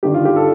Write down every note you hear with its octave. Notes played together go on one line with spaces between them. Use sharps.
G1 G2 D#3 G4
F4
G4
A4